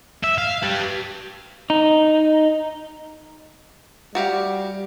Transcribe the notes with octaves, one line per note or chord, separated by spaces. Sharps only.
E5
F5
G4 B4
D#4
G3 F#4 G4 F5